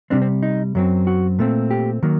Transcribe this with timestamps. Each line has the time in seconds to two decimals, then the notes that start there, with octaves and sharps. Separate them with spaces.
0.10 C3 G3 C4 D4
0.22 C4
0.43 D#4
0.75 F#2 F#3 C4
1.07 F#4
1.39 A#2 A3 C4
1.71 G4
2.03 D#3 F#3 A#3